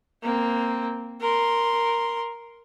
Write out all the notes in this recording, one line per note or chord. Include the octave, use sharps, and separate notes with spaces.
A#3 C4
A#4 C6